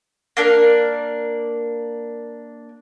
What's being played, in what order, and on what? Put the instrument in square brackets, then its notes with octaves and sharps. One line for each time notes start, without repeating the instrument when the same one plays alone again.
[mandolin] A#3 D4 A#4